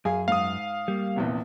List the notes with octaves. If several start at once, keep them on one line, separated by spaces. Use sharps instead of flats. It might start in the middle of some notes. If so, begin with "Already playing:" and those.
F#2 G#4 F5 G#5
G#2 F5 D#6
G3 A#3
A#1 E2 C3